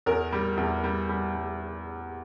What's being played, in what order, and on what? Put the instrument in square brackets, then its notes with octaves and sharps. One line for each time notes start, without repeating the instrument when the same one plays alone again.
[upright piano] E2 A#4
G3
E2
G3
G3
G3